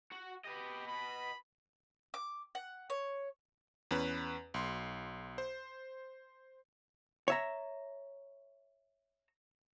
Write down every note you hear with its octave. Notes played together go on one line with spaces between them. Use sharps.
F#4
G4 B4 D#5
B5
D6
F#5
C#5
E2 C#4 B4
B1 C6
C5
C#5 E5 A#5